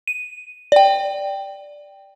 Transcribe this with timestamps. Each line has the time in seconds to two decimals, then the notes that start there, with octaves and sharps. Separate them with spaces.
0.08 D#7
0.72 D5 G5